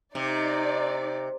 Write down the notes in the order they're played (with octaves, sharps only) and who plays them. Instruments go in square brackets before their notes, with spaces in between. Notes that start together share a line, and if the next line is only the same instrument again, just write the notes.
[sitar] C3 [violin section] D#4 D5